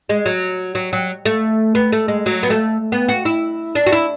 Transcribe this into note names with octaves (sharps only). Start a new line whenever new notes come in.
G#3
F#3
F#3
F#3
A3
B3
A3
G#3
F#3
B3
A3
B3
F#4
E4
D4
F#4
E4